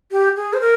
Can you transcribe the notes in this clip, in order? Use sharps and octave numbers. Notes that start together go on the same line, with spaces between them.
G4
G#4
C5
A#4